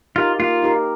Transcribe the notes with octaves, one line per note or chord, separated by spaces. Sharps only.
D#4 F4 G4 A#4
A#3 F4
D#4 G4 A#4